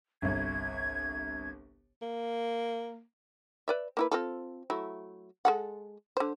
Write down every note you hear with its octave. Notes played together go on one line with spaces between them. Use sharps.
G1 C2 G#6
A#3
B4 D5 E5
A#3 E4 B4
C4 F4 A4
F#3 A3 E4
G#3 A4 F#5
D3 C5